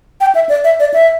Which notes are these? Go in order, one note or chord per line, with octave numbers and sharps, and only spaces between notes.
G5
E5
D5
E5
D5
E5